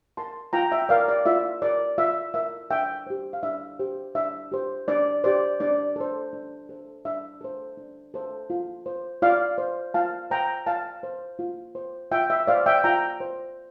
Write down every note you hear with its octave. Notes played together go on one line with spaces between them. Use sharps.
A#4 A5 C6
F4 G5 A#5
E5 G5
A#4 D5 F5
D5
F4 E5
A#4 D5
F4 E5
A#4 E5
D4 E5 G5
G4 C5
F5
D4 E5
G4 C5
D4 E5
G4 C5
D4 D5
G4 C5 D5
D4 D5
A4 C5
D4
A4 C5
D4 E5
A4 C5
D4
A4 C5
F4
C5
F4 D5 F5
C5
F4 F5 A5
C5 G5 A#5
F4 F5 A5
C5
F4
C5
F4 E5 G5
E5
C5 D5 F5
E5 G5
F4 G5 A#5
C5